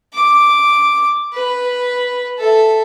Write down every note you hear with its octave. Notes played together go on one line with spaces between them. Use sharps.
D6
B4
A4 E5